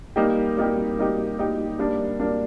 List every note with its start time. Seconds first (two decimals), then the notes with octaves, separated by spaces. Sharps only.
0.16 G3 A#3 D#4 G4
0.57 G3 A#3 D#4 G4
0.98 G3 A#3 D#4 G4
1.38 G3 A#3 D#4 G4
1.79 G3 A#3 D4
2.20 G3 A#3 D4